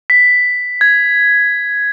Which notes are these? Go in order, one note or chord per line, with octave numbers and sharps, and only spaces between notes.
B6
G#6